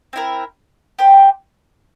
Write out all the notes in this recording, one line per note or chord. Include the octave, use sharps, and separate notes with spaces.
C4 E4 A#4
G4 C5 G5